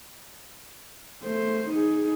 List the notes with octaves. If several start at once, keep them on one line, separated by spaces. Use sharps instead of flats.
A3 C5
D#4 G#4